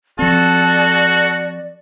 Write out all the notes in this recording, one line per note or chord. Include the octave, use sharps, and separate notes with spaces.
F3 C4 F#4 A4 D5